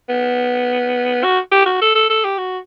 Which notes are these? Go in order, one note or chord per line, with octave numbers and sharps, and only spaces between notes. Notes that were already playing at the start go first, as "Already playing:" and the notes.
B3
F#4
G4
F#4
A4
A4
A4
G4
F#4